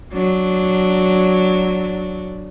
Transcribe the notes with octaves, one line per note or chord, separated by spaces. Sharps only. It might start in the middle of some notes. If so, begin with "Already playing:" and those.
F#3 D4